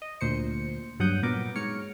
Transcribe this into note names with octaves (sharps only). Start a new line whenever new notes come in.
D#5
D2 A#2 C5 C#7
G2 F#3 F#5 D#6 G6
A#2 B3 A#4 D6
G#2 C#5 F6 C#7